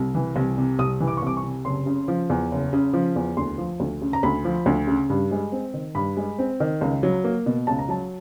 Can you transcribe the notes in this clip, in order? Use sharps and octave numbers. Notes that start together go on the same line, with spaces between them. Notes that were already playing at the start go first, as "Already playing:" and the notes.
Already playing: C2
E3
C2
C3
C2 D#6
E3
D6
C#6
C2 D6
C#6
C3
F#1 C6
C#3
F3
E2
F#1
C#3
F3
E2
D2 C6
F3
D2
C#3
A#5
D2 B5
F3
D2
C#3
G2
G#3
C4
D#3
G2 B5
G#3
C4
D#3
C#2
F#3
A#3
B2
C#2 A5
A#5
F#3 A5